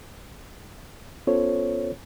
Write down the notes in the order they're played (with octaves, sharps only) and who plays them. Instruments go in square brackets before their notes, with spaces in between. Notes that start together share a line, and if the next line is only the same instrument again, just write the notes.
[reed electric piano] B3 C#4 F4 A4 C5 C#5